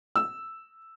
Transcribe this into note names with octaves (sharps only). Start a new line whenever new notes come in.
E6